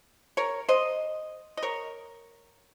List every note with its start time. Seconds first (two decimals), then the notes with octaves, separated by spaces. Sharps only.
0.37 A#4 C#5
0.69 C5 D#5
1.57 D#5
1.63 A#4 C#5